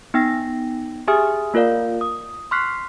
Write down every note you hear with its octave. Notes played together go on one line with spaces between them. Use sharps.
B3 D#4 G5 E6 A#6
G4 G#4 E5 G#5 D#6 F6
A#3 F4 A#4 D5 F5
D#6
C6 C#6 F6 F#6 B6 C7